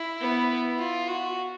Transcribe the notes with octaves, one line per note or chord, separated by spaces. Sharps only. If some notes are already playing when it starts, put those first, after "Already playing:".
Already playing: E4
B3
F4
F#4